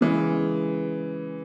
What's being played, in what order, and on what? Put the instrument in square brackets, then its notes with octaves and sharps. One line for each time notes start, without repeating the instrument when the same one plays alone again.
[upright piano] C#3 E3 G#3